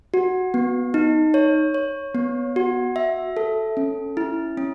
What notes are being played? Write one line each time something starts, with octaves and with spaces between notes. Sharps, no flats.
F#4
B3
D#4
C#5
C#5
B3
F#4
E5
A4
C#4
E4
C#4